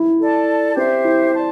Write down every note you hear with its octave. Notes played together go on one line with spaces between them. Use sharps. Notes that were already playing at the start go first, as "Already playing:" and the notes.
Already playing: E4
A4 D5 A5
C4 G4 C5 E5
E4
D5 A5 C6